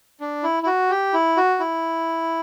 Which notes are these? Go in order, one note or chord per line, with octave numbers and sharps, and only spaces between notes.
D4
E4
E4
F#4
G4
E4
F#4
E4